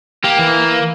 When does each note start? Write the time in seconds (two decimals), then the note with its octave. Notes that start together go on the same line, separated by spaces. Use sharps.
0.24 A#3 G4
0.39 E3